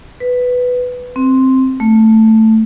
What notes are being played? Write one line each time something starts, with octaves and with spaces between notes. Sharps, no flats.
B4
C4
A3